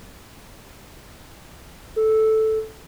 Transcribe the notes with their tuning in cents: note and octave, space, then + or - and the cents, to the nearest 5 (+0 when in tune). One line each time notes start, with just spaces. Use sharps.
A4 -5